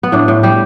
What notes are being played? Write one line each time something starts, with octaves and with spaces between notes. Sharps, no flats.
B3
A2 D4
A2
G3 G4